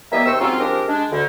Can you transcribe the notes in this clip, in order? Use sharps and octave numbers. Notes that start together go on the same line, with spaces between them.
E3 G3 A#3 B3 D#5 E5
D#2 C3 C4 C5 C#6 E6
G#2 F#3 A#3 C4 C#4 F4
F3 G#3 C4 D4 G4 A#4
G#3 D4
D2 D3